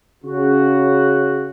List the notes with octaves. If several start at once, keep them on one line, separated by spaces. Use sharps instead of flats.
C#3 F#4